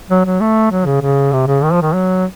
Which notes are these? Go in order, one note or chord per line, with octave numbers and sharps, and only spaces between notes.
F#3
F#3
A3
F#3
C#3
C#3
C3
C#3
D#3
F3
D#3
F#3